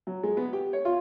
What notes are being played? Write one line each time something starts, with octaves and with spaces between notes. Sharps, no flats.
F#3
G#3
B3
G4
C#5
F4